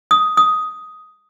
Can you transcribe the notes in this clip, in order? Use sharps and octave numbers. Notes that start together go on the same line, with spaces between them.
D#6
D#6